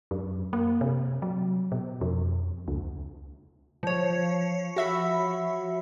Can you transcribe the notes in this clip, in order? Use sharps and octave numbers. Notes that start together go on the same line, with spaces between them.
F#2
A#3
C3
F#3
B2
F2
C#2
F3 C#5
F#4 E5 B5